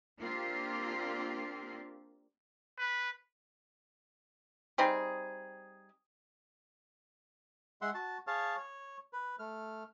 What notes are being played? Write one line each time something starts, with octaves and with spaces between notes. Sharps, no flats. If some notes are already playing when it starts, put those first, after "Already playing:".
A#3 C4 D4 F4 G4
B4
G3 C4 D#4 G#4
G#3 E5 F#5 C6
F#4 A5
G#4 C#5 F5 A5
C#5
B4
A3 F6